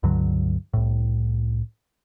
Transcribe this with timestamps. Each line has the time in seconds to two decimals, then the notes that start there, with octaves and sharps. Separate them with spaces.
0.03 C#2 G2 D3 F#3
0.73 C2 A2